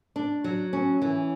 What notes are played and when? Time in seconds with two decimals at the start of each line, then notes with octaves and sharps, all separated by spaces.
0.16 D4
0.44 F#3
0.73 C#4
1.02 E3